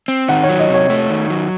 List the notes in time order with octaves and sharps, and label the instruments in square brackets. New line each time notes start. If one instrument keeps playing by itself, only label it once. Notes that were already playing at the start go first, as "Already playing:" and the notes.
[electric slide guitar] C4
[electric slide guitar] D#3 [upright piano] F#5
[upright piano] C#5
[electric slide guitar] F#3
[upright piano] D#5
[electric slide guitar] C3
[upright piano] C#5
[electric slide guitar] A3
D#3
F#3